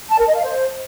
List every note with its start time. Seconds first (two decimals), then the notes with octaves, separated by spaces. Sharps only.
0.11 A5
0.19 A#4
0.27 D#5
0.35 F5
0.43 C5